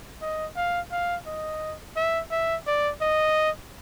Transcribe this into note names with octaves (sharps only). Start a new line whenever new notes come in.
D#5
F5
F5
D#5
E5
E5
D5
D#5